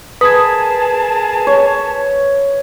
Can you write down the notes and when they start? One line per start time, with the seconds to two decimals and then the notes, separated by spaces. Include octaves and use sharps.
0.21 G#4 A#4 B4 A5 D#6 G#6
1.47 C#5